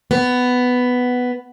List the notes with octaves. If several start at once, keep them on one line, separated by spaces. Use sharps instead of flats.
B3